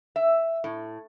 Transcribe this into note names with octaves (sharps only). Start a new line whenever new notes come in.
E5
A2